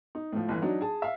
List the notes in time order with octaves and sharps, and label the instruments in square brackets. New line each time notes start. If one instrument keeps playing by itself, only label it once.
[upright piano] D#4
A2 F3
G1 E3
F#3 D4 D#4
G#4 A5
E5 F5